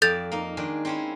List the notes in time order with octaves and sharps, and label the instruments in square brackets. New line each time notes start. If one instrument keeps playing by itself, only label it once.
[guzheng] F2 D5 A5 [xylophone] A4 G6 A6
[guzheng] A#3 D#4
D#3 G#3 D4
C4 C#4 E4